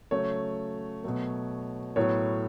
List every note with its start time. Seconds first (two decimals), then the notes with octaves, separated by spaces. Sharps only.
0.11 C#3 F#3 A3 C#5
1.04 B2 F#3 A3
1.96 A2 F#3 B3 C#5